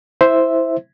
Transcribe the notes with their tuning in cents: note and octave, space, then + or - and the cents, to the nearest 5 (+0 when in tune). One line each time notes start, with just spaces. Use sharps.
E4 -5 C5 +0 E5 +0